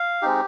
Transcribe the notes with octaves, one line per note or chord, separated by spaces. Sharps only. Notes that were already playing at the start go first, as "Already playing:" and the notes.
Already playing: F5
G#3 C4 D#4 G4